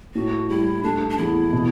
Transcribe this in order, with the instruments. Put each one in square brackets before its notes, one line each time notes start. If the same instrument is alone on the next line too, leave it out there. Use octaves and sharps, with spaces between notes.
[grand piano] A2 [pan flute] F#4
[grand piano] G3 [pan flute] E4
[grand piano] A3 [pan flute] D4
[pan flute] D4
[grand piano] E2 [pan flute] E4
[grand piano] B2